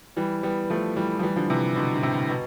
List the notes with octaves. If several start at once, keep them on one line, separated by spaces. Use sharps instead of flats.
E3 G3
G3 B3
F3 A3
E3 G3
F3
E3 G3
D3 F3
C3 E3
B2 D3
D3
A2 C3
B2